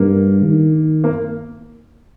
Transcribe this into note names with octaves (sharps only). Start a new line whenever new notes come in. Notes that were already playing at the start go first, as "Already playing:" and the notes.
Already playing: G2 A#3
D#3
A#3